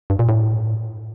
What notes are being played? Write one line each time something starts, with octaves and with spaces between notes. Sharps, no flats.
G2
A#2
A2